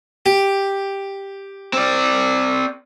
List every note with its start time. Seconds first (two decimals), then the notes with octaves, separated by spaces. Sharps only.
0.26 G4
1.73 C4 D5